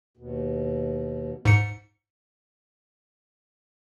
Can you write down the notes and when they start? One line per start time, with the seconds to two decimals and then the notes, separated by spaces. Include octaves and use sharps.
0.17 D#2 B2
1.45 G#2 C#7